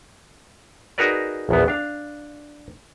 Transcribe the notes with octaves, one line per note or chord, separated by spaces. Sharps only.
D#4 F#4 G#4 A#4 B4 D5
A#1 E2 B3
D4 F5